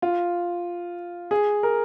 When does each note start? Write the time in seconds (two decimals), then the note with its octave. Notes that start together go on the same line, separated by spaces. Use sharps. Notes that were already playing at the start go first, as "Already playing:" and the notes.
0.02 F4
1.31 G#4
1.63 A#4